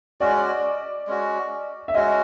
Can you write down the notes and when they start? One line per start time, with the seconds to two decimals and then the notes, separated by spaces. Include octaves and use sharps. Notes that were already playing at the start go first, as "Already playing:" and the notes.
0.20 G#3 C#4 F#4 D5
1.07 G#3 C#4 F#4
1.88 E5
1.94 G#3 C#4 F#4 D#5